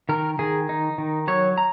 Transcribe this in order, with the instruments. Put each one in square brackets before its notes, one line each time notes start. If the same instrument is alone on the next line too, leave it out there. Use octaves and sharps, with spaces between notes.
[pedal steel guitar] D#3 A#4
D#3 G#4
D#4
D#3
F#3 C#5
A#5